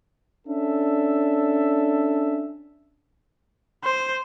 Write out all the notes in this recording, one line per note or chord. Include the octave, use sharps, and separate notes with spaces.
C#4 D4 A4 E5
C5